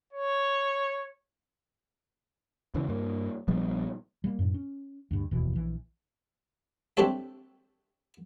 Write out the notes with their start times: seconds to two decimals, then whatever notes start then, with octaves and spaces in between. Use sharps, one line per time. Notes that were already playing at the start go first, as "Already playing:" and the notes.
0.13 C#5
2.74 C#2 C#3 E3
2.88 G2 A#3
3.48 A#1 F3 G3 B3
4.24 G3 A#3
4.39 F#2 A2
4.54 C#4
5.11 D2 G2
5.31 F1 D#2 B2 E3
5.53 A#1 E3
6.97 C4 D4 G4 A4 C#5 E5